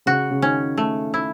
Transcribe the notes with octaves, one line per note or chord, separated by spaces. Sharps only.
C#3 F#4
C#3
D#3 C#4
A3
E4